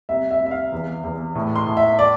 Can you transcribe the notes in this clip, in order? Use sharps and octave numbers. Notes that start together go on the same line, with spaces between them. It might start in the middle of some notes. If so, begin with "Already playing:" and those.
C2 E5
E5
C2
E5
F5
E2
E2
A2
C6
A2
E5
D5